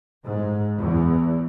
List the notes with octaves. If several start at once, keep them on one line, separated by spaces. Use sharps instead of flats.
G#2
E2